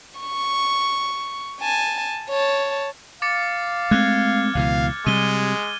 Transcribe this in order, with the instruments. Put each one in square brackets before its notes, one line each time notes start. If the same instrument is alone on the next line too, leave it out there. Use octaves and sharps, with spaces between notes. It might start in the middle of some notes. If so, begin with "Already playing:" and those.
[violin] C#6
G#5 A5
C#5 A5
[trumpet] F5 [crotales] D6 A6 C#7
[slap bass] G#3 A3 C4 [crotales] F6 F#6 G#6
[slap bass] C#2 B2 E3 [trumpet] F5
[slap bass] C3 G3 [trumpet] G#3 [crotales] D#7 G7